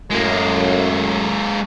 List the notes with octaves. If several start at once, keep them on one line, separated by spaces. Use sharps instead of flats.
F#2 A2 G#3 A#3